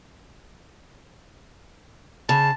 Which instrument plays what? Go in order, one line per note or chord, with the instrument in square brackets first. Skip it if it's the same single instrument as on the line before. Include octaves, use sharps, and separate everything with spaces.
[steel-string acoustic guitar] C#3 [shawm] A5